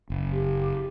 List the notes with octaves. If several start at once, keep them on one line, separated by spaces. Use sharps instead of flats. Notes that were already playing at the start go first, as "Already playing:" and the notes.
F#1
G4